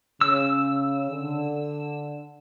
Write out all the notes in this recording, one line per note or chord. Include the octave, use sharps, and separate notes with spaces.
C#3 E6
D3